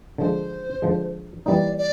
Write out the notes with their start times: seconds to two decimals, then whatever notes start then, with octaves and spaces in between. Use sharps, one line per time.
0.18 D3 F3 G#3 C5
0.82 D3 F3 G#3
1.46 E3 G3 A#3 D#4 D5
1.78 D5